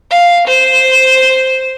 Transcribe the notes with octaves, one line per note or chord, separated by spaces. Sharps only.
F5
C5